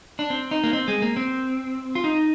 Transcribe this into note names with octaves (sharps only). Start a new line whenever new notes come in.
D4
C4
D#4
A#3
C4
G#3
A#3
C4
F4
D#4